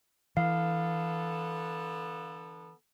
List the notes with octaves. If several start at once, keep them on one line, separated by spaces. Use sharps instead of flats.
D3 E3 B3 A4 F5